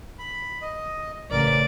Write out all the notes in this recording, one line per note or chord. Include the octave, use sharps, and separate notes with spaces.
B5
D#5
A1 C#3 A#4 D5